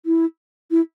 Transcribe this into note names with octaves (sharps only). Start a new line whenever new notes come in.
E4
E4